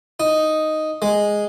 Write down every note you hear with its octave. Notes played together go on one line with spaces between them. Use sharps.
D#4
G#3